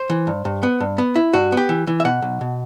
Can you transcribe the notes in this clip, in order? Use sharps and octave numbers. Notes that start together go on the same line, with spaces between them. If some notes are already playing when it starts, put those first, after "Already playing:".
Already playing: C5
E3
G2
G2
B3
G2
B3
E4
G2 F#4
B3 G4
E3
E3
E5
B2 F#5
B1
B2